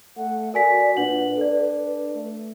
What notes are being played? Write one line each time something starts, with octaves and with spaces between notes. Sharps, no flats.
A3 F#5
F#4 A#4 D5 G#5 B6
A#2 D4 B4 F#5 F#7
D4 A4 D5
A3